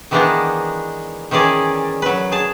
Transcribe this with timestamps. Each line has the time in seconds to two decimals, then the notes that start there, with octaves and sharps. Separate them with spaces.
0.11 D#3 E3 G#3 B3 D4 D#4
1.31 D#3 E3 C#4 G#4 D5
2.02 F#3 B4
2.32 G#4 A5